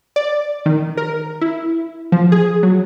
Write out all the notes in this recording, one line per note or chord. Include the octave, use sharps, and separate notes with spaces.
D5
D#3
A#4
E4
F3
G#4
F#3